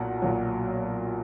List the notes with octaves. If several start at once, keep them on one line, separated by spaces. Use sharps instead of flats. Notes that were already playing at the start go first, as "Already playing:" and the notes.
Already playing: B1 A#2 F#3 F#5
B1 A#2 F#3